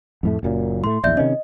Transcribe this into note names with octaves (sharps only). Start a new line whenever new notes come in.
F2 A2 A3
F#1 F#2 A#2
A2 A3 C6
A#1 E2 D5 E5 G6
C3 D#3 C#4 D#5